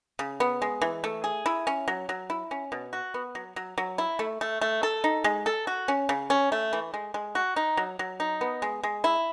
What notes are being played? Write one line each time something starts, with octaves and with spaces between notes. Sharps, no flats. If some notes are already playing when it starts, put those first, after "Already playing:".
C#3
B3
G#3
E3
A3
G#4
E4
C#4
F#3
F#3
E4
C#4
B2
F#4
B3
F#3
F#3
F#3
E4
A3
A3
A3
A4
D#4
G#3
A4
F#4
C#4
C#3
C#4
A3
E3
G#3
G#3
F#4
D#4
F#3
F#3
D#4
B3
G#3
G#3
E4